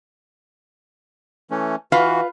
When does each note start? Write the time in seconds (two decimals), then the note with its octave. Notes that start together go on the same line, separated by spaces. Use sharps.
1.51 E3 A3 C#4
1.92 E3 F4 F#4 B4 F5